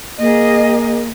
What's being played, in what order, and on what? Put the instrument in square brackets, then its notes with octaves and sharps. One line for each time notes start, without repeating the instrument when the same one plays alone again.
[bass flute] A#3 [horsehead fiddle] G#4 D#5